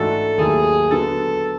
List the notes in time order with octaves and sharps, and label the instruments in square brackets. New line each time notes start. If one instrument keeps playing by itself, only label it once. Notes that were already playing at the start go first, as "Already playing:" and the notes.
Already playing: [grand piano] G#2 E3 A3 D4 F#4 [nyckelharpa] A4
[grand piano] D#2 D#3 F#3 A3 [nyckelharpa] G#4
[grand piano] D3 F#3 B3 [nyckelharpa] A4